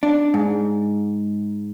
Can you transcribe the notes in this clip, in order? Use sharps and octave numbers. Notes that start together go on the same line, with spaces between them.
D4
G#2